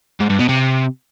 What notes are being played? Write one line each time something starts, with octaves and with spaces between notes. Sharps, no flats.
G#2
G2
B2
C3